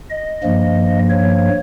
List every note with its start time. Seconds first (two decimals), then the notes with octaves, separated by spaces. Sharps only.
0.10 D#5
0.43 G2 F3 A#3
1.09 C#5